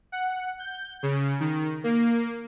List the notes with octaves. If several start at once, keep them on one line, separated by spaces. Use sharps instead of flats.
F#5
G6
C#3
D#3
A#3